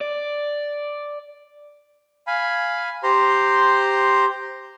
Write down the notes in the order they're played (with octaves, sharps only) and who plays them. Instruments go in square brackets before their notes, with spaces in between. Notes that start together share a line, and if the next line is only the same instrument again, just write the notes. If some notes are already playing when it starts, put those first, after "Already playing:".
[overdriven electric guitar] D5
[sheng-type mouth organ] F5 G#5 B5
G4 C5 A#5 C6